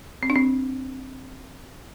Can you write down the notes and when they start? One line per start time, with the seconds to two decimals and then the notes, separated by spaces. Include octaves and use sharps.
0.23 C4
0.30 D4
0.36 C4